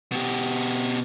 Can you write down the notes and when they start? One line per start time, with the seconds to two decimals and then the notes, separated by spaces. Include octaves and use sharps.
0.12 B2 G4